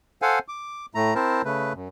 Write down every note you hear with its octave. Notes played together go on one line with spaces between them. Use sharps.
A4 C5 F5 F#5 G#5
D6
A2 A3 A#5
C4 E4 A#4 C5 A5
C#3 A3 B4
F#2